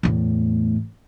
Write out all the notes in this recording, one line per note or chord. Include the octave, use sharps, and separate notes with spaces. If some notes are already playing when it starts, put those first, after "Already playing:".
E2 A2